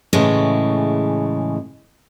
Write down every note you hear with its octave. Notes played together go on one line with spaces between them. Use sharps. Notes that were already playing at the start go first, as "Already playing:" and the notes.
A2 C#3 E3 G#3 A3